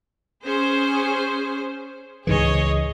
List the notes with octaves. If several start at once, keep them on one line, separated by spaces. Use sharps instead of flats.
C#4 G#4 C5
C#2 G#2 E3 G#4 C#5 D#5